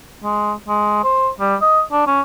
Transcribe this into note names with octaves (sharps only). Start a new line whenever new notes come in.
G#3
G#3
C5
G3
D#5
D4
C#4